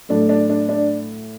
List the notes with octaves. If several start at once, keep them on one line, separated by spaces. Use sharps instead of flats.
A2 F#3 A3 D4
D4
D4
D4